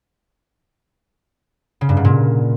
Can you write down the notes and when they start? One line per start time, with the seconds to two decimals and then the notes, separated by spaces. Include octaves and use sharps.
1.81 C#3
1.89 G2
1.97 G#2
2.05 A#2